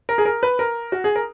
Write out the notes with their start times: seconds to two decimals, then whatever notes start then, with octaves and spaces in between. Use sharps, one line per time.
0.09 A#4
0.18 G#4
0.25 A#4
0.43 B4
0.59 A#4
0.92 F#4
1.04 G#4
1.16 A#4